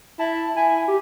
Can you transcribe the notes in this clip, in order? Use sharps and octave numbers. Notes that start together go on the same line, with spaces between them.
E4 A5
E4 G#5
G4